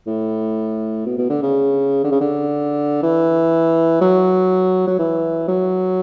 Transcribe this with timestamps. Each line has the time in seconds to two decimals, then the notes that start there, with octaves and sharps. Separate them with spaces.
0.07 A2
1.06 B2
1.18 B2
1.29 D3
1.42 C#3
2.04 D3
2.12 C#3
2.21 D3
3.03 E3
4.01 F#3
4.87 F#3
4.99 E3
5.48 F#3